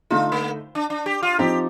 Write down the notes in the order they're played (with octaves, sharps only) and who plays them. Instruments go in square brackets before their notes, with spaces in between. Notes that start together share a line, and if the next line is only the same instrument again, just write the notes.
[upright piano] D3 A3 D#4 [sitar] F4
[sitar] A#3
D4
D4
G4
F4
[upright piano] F3 C4 D#4 [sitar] G4